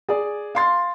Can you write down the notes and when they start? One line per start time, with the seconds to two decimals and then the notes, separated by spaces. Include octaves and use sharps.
0.09 G#4 D5
0.55 F5 C6 A6